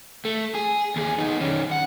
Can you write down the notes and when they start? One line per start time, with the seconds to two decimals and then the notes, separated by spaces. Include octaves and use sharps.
0.25 A3
0.55 G#4
0.96 D#2 G#4
1.18 B3 D#4
1.40 D#3 C#4
1.71 F#5